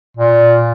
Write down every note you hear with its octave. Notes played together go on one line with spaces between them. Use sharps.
A#2